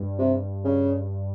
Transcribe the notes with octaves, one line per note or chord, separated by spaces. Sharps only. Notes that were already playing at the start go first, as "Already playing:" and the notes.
Already playing: G2
C3
C#3